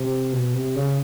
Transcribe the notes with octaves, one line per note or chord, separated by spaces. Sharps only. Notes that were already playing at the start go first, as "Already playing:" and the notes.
Already playing: C3
B2
C3
C#3